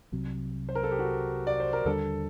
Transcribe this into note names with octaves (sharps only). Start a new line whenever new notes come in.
C2 C3 F#3
C5
A#4
A4
G4
F#4
D5
C5
A#4
D#2 D3 G3 D4 A4